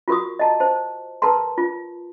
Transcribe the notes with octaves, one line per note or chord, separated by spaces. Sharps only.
F4 F#4 A#4 C#6 D#6
D#5 A5 A#5
C5 A5
A#4 B4 A5 A#5 C6
F4